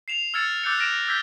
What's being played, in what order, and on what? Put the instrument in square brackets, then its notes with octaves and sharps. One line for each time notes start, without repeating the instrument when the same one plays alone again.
[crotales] C7 E7 F7
E6 F6 G#6 A6 C#7 E7
D6 E6 F#6 G6 A6 C#7
F6 A#6 D7 E7
D6 E6 G6 G#6 B6 G7